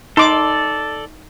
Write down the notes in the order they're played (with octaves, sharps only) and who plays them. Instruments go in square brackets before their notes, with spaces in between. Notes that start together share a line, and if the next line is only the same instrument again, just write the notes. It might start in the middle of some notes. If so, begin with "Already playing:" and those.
[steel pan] D#4 C6 D6 [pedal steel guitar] A4 D5